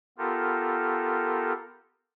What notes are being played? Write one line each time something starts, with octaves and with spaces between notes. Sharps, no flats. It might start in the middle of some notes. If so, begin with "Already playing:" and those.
B3 F4 G4 A4 A#4